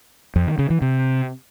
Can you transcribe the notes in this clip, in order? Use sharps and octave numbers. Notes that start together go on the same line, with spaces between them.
F2
D#3
C#3
E3
C3